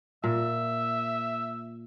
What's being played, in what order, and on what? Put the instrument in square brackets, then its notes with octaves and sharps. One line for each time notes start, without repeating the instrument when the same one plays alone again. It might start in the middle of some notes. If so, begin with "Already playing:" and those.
[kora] A#2 [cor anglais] E5